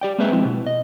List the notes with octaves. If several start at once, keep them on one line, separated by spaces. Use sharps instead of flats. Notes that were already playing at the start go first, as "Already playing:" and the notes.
G4 D5 G5
G#3 A#3 C4 G#4 B4 E5
F3 G#3 C4 E4
B2
D#5